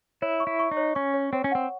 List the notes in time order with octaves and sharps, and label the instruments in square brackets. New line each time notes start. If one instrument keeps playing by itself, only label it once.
[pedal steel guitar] E4 [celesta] C#5
[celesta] C#6
[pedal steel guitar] E4
[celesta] C#6
[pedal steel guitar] D#4
[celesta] C#5
[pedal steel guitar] C#4 [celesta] C#6
[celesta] C#5
[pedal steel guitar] C4 [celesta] C#5
[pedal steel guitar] C#4
[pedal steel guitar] C4 [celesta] F#5